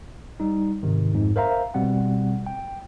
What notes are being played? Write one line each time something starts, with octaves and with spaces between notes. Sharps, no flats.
G3 D#4
G#2 C3 D#3
F2 G#2
A#4 C5 E5 F5 A#5
B2 G3 C4 F#5
G5